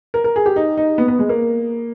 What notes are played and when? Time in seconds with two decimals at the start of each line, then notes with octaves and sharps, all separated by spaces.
0.14 A#4
0.24 A#4
0.36 G#4
0.46 G4
0.56 D#4
0.77 D#4
0.98 B3
1.08 B3
1.19 G#3
1.29 A#3